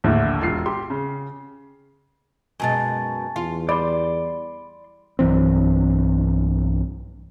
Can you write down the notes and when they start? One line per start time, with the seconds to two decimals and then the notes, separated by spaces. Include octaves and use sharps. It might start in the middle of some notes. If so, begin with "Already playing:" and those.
0.04 A#1 D#2 A2 D3 A3
0.42 E1 F4 C7
0.66 G4 C6
0.90 C#3
2.60 F#2 B2 G#3 G#5 A5 A6
3.36 E2 F4
3.69 G3 D5 B5 C6
5.19 B1 G2 E3 C4